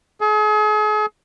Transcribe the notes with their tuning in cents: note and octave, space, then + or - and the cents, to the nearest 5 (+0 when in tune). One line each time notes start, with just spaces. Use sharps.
G#4 +40